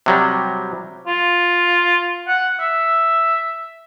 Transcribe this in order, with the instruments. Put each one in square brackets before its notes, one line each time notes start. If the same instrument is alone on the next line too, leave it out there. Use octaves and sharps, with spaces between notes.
[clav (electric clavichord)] C3 F#3 G3
[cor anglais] F4
F#5
E5